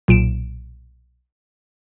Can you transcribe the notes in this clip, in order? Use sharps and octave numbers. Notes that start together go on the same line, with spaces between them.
B1 A#2 D7 E7